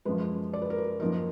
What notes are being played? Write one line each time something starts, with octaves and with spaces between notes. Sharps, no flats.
F#2 F3 G#3 B4
D5
B4
A#4
B4
F#2 F3 A#3 D#4 A#4